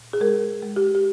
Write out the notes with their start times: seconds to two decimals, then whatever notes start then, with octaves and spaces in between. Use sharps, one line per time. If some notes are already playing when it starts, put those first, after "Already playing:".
Already playing: A#2
0.13 G#4
0.21 G#3 A#4
0.62 G#3
0.76 G4
0.95 G4